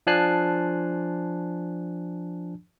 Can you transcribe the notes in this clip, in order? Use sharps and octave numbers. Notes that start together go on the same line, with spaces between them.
F3 D4 G#5 A5 F#6 C7